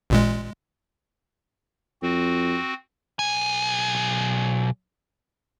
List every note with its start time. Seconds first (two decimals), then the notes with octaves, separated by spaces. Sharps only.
0.10 A1 A#2 G#3
2.02 F2 C4 F#4
3.19 B1 G#5